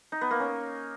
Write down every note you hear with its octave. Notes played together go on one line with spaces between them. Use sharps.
D#4
B3
A#3
C#4